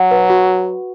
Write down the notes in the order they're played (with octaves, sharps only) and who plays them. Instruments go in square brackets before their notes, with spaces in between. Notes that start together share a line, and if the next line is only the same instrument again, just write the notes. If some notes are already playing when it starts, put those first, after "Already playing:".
Already playing: [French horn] F#3 [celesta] F#5 C#6
[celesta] B4
F#4